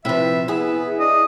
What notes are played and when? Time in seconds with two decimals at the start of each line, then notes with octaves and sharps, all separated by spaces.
0.05 C3 F3 E4 B4 E5
0.48 B3 E4 G#4 E5
0.99 D4 D#5